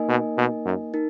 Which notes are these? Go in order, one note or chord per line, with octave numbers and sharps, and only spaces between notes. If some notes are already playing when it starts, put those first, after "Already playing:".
Already playing: A#3 D#4 A#4 D#5 G#5
B2
B2
F#2
D#4 A#4